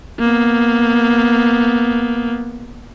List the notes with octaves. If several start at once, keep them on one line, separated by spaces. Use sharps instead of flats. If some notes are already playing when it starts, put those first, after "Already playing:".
A#3 B3